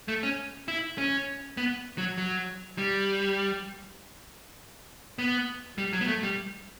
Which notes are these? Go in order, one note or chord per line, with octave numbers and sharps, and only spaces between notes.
A3
C#4
E4
C#4
B3
F#3
F#3
G3
B3
G3
F#3
B3
A3
G3